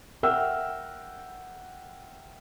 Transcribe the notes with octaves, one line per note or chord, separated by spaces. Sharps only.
A#4 E5 F#5 G5 E6 F6